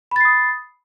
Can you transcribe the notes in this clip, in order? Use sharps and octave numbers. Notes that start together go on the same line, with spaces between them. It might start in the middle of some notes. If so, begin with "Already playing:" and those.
B5 D#6 A6 C7